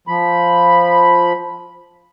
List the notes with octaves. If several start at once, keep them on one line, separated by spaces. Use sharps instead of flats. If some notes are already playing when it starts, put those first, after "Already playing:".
F3 B5